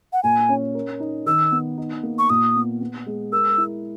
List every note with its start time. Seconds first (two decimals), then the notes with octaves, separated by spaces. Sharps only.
0.13 F#5
0.23 A#2 G#5
0.49 C#4
0.75 A#4
1.00 D#4
1.26 D#3 E6
1.52 B3
1.78 D#4
2.03 A#3
2.19 C#6
2.29 A#2 D#6
2.55 B3
2.81 B3
3.06 G#3
3.32 A#4 E6
3.58 E4